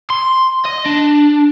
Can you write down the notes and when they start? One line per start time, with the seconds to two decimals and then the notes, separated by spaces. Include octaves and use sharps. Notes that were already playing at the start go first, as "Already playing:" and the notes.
0.10 C6
0.65 D#5
0.86 D4